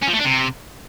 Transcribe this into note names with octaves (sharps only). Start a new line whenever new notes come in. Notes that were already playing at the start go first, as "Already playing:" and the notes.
C#4
F3
A3
D4
C3